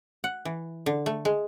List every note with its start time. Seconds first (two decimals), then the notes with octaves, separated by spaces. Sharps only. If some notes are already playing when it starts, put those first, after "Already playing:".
0.24 F#5
0.45 E3
0.86 D3
1.06 A3
1.25 G#3